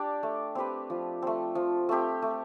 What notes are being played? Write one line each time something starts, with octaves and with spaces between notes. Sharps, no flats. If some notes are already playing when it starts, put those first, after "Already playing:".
Already playing: D4 G4 D5
A3
C4 G4 B4
F3
A3 C4
F3
A3 C4 G4
A3